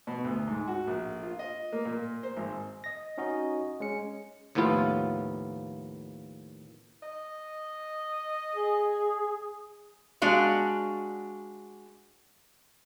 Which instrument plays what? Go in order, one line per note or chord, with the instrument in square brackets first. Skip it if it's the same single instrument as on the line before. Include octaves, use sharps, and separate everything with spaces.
[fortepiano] B2
D2
G#2
F#4
A#1
F4
D#5
A#3
A#2
C5
G#1
[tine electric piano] D#5 A#6
C#4 D#4 F#4 D#5
G#3 C#4 C#7
[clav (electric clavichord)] D#2 A2 F3 B3 F4
[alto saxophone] D#5
[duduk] G#4
[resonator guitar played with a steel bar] G#3 D4 F#4 F5